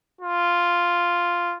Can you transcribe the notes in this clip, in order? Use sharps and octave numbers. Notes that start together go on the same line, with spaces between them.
F4